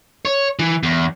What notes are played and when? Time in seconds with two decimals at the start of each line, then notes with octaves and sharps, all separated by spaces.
0.25 C#5
0.59 E3
0.83 E2